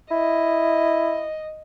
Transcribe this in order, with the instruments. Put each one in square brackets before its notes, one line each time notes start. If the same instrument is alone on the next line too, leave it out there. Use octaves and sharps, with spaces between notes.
[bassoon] E4 [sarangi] D#5